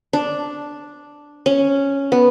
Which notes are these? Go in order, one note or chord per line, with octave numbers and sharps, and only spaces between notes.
D4
C#4
B3